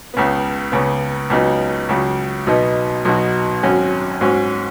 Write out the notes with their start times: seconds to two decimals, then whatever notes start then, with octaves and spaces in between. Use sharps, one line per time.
0.14 C#2 C#3 B3
0.72 C#2 C#3 B3
1.30 C#2 C#3 F#3 B3 D#4
1.89 C#2 C#3 F#3
2.46 B1 B2 B3 D#4
3.05 B1 B2 F#3 D#4 F#4
3.63 G#1 F#2 F#3 C#4 F#4
4.21 G#2 F#3 C#4 F#4